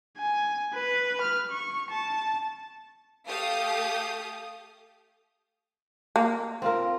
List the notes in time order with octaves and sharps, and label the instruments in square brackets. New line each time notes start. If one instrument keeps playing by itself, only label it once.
[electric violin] G#5
B4
F6
C#6
A5
[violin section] A3 G4 A4 F5 D#6 G6
[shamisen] A#3
[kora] C4 F4 A#4